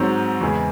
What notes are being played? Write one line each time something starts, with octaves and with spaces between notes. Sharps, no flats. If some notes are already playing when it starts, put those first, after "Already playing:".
Already playing: G#2 F#3 C4
E2 C#3 E3 G#3